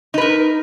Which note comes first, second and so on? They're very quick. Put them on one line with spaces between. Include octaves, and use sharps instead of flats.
D#4 B4 A#4